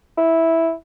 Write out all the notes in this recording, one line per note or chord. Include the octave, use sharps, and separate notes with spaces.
E4